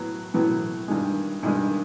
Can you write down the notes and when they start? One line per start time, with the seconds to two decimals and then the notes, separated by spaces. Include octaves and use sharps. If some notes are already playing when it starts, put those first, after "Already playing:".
Already playing: A2 F#3 B3
0.34 A2 F#3 B3
0.88 G2 D#3 G#3
1.43 G2 D#3 G#3